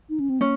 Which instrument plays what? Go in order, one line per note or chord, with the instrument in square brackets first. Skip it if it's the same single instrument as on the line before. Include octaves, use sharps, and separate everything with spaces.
[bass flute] D#4
C#4
C4
[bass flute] A#3 [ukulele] C#4